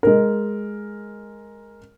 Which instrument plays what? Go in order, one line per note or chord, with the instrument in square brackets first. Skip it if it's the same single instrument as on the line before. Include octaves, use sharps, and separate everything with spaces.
[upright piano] G#3 A#4